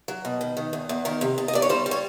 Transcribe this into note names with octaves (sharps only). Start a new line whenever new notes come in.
F#3
B2
D#3
D#3
E2
E2
D#3 A#4
C3
E2
D#5
E2 D5
C#5
G3 C5
G3
C#5